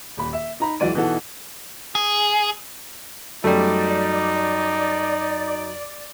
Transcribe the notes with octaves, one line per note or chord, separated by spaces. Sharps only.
D#1 B5
E5
D#4 A#5 B5
C#2 E3 F#3 D5 D#7
B2 E3 D#4 F#4 A4
G#4
F#2 G3 A3 D#4 D5